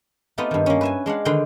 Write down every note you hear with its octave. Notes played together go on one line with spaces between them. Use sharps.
A3 B3 C4 D#4 F4 G4
G2 D#3
A#3 C#4
B4 E5 G#5
G#3 D4 F5 F#5
D3 D#3 B4 G5 C6